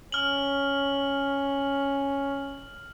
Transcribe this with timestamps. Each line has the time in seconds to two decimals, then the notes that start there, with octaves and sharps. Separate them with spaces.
0.12 C#4 F6 F#7